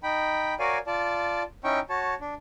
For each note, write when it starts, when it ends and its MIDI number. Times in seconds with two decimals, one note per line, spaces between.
0.03 0.54 63
0.03 0.54 79
0.03 0.54 83
0.59 0.78 66
0.59 0.78 70
0.59 0.78 73
0.59 0.78 74
0.59 0.78 77
0.59 0.78 80
0.87 1.43 65
0.87 1.43 74
0.87 1.43 81
1.64 1.80 61
1.64 1.80 63
1.64 1.80 64
1.64 1.80 79
1.64 1.80 85
1.90 2.15 66
1.90 2.15 73
1.90 2.15 81
2.21 2.34 62